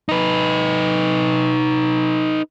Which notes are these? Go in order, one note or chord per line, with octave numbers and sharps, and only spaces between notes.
D#4 B4